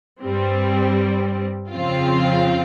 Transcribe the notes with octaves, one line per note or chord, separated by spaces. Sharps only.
G2 G3 C4
F2 C#3 F3 C4 F4